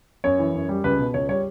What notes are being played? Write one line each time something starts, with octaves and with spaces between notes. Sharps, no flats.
F#2 C#5
E3
F#2
G3
C#2 B4
B2
C#2 C#5
G3 C#5